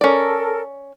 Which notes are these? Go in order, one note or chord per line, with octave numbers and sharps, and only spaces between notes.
C#4 A4 A#4 D5